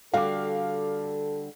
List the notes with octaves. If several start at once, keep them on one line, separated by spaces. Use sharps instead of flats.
D3 G3 F#4 A4 F5 D6